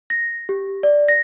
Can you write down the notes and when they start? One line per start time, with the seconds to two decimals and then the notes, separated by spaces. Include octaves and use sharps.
0.10 A#6
0.49 G4
0.83 D5
1.08 A#6